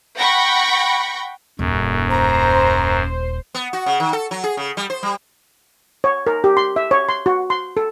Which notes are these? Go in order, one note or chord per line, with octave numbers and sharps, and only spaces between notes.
F#5 G5 B5 C#6 A#6
D#1 F#2
C5 A#5
B3
F#4
C#3
D#3
A4
F#3
G#4
C#3
G3
C5
G3
C#5
A#4
G4
C6
E5
C#5
C6
F#4
C6
A4